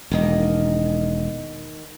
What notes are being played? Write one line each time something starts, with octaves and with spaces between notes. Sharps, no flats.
E1 D#3 A#3 D#4